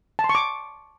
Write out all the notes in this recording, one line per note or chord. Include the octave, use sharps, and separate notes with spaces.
A5
C6
C#6
D6